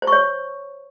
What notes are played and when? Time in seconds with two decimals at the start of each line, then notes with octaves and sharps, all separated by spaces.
0.02 C5
0.07 C#6
0.12 C#5